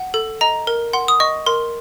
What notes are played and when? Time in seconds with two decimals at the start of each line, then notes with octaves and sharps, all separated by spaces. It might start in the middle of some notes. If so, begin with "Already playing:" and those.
Already playing: F#5
0.14 A4
0.41 D#5 A#5
0.67 A#4
0.93 F#5 C6
1.08 D#6
1.20 D#5 C#6
1.46 A#4 C6